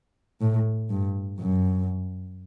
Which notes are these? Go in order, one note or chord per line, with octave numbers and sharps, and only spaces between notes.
A2
G2
F#2